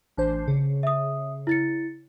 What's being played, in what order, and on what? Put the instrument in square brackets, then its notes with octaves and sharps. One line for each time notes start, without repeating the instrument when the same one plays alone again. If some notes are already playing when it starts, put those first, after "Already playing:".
[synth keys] A1 D4 C5
C#3
[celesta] E5 D#6
E4 A6 C#7